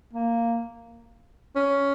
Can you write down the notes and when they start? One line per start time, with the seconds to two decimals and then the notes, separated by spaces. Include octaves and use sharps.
0.13 A#3
1.56 C#4